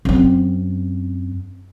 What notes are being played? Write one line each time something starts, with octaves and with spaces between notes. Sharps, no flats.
F#2 C4